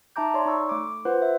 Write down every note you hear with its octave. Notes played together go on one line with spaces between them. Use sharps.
D#4 E5 A5 A#5 D6 G6
C#5 D5 C6
D#4 C#6 E6
A3 D6
F4 B4 C5 F#5
E5